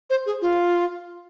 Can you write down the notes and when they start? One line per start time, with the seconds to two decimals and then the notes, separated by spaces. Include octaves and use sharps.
0.10 C5
0.26 G#4
0.42 F4